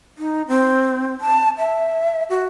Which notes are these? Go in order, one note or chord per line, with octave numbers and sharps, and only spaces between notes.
D#4
C4
A5
E5
F#4